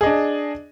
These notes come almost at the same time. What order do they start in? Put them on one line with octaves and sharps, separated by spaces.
G#4 D#5 D4